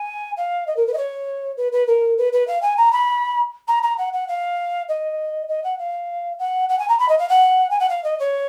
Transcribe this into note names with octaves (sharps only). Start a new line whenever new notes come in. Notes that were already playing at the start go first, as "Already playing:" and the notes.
Already playing: G#5
F5
D#5
A#4
B4
D#5
C#5
B4
B4
A#4
B4
B4
F5
G#5
A#5
B5
A#5
A#5
F#5
F#5
F5
D#5
D#5
F#5
F5
F#5
F#5
G#5
A#5
B5
D#5
F5
F#5
G#5
F#5
F5
D#5
C#5